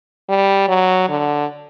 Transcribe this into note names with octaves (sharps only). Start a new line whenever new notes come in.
G3
F#3
D3